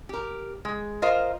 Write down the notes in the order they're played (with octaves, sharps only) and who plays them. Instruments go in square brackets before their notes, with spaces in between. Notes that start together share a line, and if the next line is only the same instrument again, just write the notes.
[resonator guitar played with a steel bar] G4 A#4
G#3
F4 A#4 C5 D#5 F5